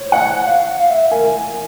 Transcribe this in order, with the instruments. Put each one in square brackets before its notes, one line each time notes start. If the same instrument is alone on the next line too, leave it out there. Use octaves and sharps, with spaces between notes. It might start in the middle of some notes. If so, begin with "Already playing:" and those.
Already playing: [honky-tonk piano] C5 C#5
F#5
[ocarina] F5
F5
E5
[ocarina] A#4 [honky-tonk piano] G#5